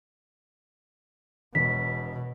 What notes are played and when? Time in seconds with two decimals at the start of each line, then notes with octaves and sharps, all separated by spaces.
1.55 E1 B2 B6